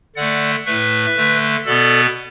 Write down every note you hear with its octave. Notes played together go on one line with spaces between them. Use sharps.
D3 A3 D5 F#5
A2 A3 B4 E5
D3 A3
B2 B3 A4 D5